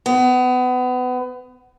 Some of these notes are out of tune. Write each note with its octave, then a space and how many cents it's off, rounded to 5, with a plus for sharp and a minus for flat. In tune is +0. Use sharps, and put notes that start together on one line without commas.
B3 +30